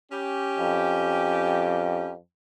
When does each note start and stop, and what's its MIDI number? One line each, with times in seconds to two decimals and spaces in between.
0.12 2.11 61
0.12 2.11 67
0.59 2.18 41